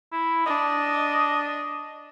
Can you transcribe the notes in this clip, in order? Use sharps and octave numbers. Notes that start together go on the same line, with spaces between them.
E4
D4 D#5